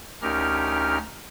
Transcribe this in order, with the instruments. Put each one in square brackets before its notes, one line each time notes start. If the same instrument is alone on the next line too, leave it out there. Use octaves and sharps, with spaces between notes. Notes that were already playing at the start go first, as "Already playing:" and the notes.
[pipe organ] D2 C#4 D#4 G4 A#4 F6